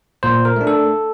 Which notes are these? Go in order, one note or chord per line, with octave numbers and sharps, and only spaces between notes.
A#2 C5
A#4
A3 D4
A4